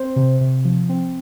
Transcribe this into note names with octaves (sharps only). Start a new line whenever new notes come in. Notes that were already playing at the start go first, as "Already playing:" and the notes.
Already playing: C4 C5
C3
C3
F3
C4